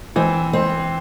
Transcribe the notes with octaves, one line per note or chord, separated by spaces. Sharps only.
E3 C4
C4